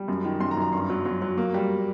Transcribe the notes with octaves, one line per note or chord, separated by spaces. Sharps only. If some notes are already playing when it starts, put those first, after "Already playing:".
Already playing: G3
F#2
D#3
F#2 C6
A#5
F#2
A#5
G2 C6
F#3
F#3
F#3
A#3
G3